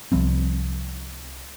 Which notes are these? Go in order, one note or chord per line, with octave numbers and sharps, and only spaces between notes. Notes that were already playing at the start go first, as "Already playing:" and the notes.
C2 F3 G3 C4